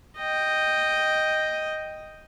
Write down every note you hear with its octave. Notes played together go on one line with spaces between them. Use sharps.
D#5 G5